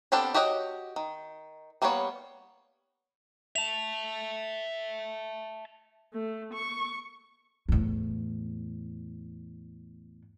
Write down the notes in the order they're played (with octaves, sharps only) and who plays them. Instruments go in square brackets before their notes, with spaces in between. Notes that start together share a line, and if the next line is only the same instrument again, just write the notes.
[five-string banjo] B3 C4 D4 G4 A4
F#4 G4 C#5 D#5 F#5
D#3
G3 A#3 B3 D4 C#5
[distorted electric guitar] E5 A5 [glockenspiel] F7
[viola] A3
C#6
[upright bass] E2 A2